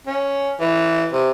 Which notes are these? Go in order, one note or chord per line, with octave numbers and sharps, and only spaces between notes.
C#4
E3
C3